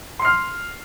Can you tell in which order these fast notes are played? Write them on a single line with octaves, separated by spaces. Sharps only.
C6 C7 F6